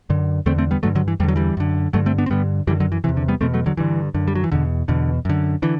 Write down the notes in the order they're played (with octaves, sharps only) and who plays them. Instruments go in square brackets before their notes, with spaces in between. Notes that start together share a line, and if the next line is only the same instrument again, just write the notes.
[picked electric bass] F#2 D3
E2 D3 A3 C4
A3 C4
G3 B3
G2 D3 F#3 A3
D3 F#3
E3
E2 G3
D3
F#3
E3 G3
F#2 D3
G2 D3 F#3 A3
A3 C4
B3 D4
C4
G2 D3 G3 B3
F#2 D3 E3 G3
D3 F#3
E3
E2 C3 E3
D3
G3 B3
E2 B2 A3 C4
F#3 A3
D3 F#3
G2 D3 E3
F#2 D3
G3
F#3
E3
E2 B2 D3
E2 B2 D3
F#2 D3
D3 E3